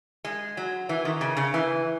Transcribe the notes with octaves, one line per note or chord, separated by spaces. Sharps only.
G#3
F#3
E3
D#3
C#3
C#3
E3